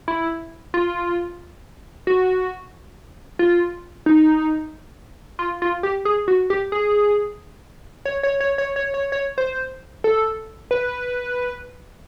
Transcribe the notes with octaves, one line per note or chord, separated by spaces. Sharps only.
E4
F4
F#4
F4
D#4
F4
F4
G4
G#4
F#4
G4
G#4
C#5
C#5
C#5
C#5
C#5
C#5
C#5
C5
A4
B4